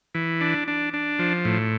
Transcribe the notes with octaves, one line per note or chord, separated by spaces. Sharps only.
E3
D4
D4
D4
F3
A2